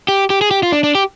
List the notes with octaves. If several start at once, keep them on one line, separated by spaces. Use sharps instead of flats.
G4
G4
G#4
G4
F4
D4
D4
G4